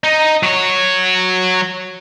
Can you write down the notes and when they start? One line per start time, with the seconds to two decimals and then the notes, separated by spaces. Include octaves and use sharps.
0.04 D#4
0.43 F#3 C#5